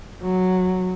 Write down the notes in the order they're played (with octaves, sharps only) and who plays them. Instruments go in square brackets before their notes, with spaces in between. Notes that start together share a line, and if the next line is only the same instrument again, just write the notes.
[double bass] F#3